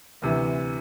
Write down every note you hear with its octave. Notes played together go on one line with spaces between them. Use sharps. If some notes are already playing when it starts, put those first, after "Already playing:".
D2 C3 E3